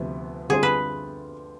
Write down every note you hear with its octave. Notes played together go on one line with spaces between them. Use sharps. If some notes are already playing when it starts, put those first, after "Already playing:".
Already playing: D2 C3 F3 B3
D3 G3 C4 F4 G#4 C5
B4